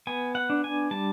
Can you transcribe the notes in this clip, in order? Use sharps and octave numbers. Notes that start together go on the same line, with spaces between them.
B3 G#5
F#5
D4
G#5
G3 A5